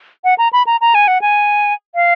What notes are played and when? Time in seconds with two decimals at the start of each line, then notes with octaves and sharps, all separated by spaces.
0.24 F#5
0.38 A#5
0.53 B5
0.66 A#5
0.81 A#5
0.94 G#5
1.08 F#5
1.21 G#5
1.95 F5